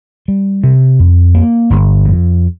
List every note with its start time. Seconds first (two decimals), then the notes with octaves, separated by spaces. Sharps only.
0.28 G3
0.64 C3
0.99 F2
1.35 A#3
1.70 G1
2.05 F2